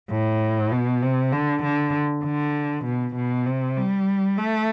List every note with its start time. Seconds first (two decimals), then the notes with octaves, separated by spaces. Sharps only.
0.11 A2
0.72 B2
1.02 C3
1.32 D3
1.64 D3
2.24 D3
2.85 B2
3.16 B2
3.46 C3
3.77 G3
4.37 A3